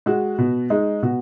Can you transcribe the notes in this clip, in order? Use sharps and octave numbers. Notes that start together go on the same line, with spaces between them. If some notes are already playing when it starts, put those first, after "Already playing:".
G#3 F#4
B2
G#3 D#4
B2 F#4